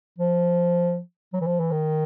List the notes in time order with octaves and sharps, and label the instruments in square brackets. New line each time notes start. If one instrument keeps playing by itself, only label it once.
[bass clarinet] F3
F#3
E3
F3
E3
D#3